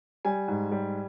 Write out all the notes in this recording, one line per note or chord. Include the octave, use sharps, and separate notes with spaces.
G3 G#5
G#2
G3